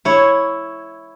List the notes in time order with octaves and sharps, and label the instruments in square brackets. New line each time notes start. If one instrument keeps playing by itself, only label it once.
[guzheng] E4 C#5